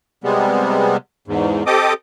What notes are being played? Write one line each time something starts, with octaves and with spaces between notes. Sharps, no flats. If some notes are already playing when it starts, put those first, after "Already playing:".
C3 G3 G#3 B3
E2 G#2
C4 G4 A4 D#5 D6 D#6